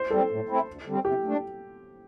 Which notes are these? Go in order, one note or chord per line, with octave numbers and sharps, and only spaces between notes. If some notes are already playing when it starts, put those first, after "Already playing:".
Already playing: C5
G3 C4 A4
A2
A3 C4 E4
D2
D3 G3 C4
C3 G4
A3 D4